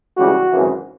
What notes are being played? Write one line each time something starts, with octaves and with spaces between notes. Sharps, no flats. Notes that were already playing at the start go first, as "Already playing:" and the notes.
C#2 C#3 E3 G3 F#4
G#1 F#2 C#3 E3